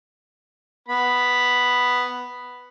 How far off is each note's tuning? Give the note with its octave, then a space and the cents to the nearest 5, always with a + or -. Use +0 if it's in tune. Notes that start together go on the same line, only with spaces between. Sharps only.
B3 +0 B5 +0